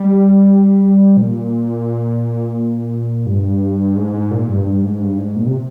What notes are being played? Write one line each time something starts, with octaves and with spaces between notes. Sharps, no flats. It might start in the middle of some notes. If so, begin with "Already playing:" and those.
Already playing: G3
A#2
G2
G#2
G#2
A#2
G2
G2
G#2
G2
G#2
A#2
C3